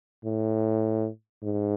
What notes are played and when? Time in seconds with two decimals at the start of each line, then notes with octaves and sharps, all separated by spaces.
0.24 A2
1.43 G#2